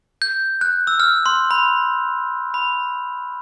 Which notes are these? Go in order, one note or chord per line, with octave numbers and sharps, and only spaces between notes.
G6
F#6
E6
F6
C6
B5
B5